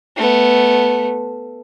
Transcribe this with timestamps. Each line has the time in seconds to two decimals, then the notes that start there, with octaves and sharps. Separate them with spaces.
0.17 A3 B3